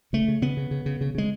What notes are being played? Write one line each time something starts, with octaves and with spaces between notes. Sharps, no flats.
C#3 A3
C#3
C#3 B3
C#3
C#3
C#3
C#3
C#3 G#3